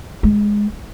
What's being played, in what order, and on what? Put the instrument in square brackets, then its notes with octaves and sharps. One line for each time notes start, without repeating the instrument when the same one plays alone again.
[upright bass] G#3